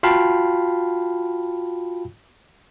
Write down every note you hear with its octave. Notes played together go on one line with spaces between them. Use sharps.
F4 F#4 F5 G5 A5 B5